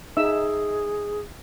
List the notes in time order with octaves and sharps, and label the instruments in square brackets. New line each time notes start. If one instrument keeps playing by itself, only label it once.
[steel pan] D#4 E5 E6 [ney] G#4